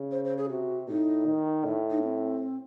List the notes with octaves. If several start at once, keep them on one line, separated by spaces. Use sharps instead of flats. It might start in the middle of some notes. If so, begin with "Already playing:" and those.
Already playing: C#3
C5
C5
G#4
C3 F#4
A2 D#4
D#3
A2 D#4
D#4
C4